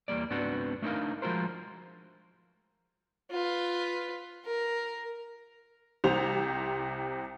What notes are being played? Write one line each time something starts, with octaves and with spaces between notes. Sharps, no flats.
E2 G3 A#3 D5
C#2 G#2 B3 C4 D4 F#4
A3 D4 D#4 A4 A#4 F5
F3 G#3 F4 F#4 A#4 C5
F4 B4
A#4
C2 C3 C5 F7